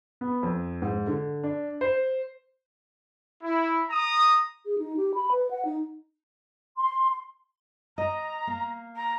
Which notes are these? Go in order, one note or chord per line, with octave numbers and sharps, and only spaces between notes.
B3
F2
G#2
D3
D4
C5
E4
A#5 D#6
G#4
D#4
G4
B5
B4
F#5
D#4
C6
D#5 A#5
A#3
A#5